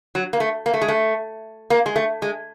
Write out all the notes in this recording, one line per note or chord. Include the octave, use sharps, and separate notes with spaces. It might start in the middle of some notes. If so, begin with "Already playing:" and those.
F#3
A#3
A3
A#3
A3
G#3
A3
A#3
G#3
A3
G#3